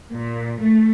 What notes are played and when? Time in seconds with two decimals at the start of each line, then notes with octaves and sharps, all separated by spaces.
0.13 A#2
0.61 A3